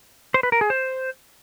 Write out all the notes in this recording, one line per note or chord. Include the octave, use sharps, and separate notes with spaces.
C5
B4
A#4
G#4
C5